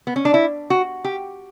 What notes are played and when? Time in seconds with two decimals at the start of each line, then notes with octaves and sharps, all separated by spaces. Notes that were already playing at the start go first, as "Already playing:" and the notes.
0.07 B3
0.16 C#4
0.25 D4
0.34 E4
0.70 F#4
1.04 G4